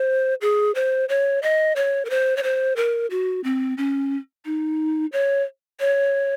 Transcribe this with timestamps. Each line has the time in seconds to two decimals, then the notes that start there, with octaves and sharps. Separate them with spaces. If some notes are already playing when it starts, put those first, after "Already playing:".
Already playing: C5
0.41 G#4
0.75 C5
1.09 C#5
1.43 D#5
1.76 C#5
2.05 A#4
2.10 C5
2.37 C#5
2.43 C5
2.76 A#4
3.10 F#4
3.44 C4
3.78 C#4
4.45 D#4
5.13 C#5
5.80 C#5